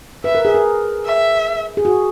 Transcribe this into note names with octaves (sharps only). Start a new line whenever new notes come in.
B4 E5
A#4
G#4
A#4
E5
G#4
F#4